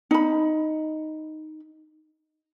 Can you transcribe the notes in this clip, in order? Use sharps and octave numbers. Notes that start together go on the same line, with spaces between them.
D#4 B5